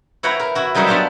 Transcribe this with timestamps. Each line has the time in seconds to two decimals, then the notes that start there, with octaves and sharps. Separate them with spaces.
0.23 E4 B4 C#5 F#5 G5 A#5
0.40 A#4
0.55 E4 F#4
0.75 F#3 G3 D#4 A#4 C#5 E5
0.87 B3 D4 F4 G4 A5 A#5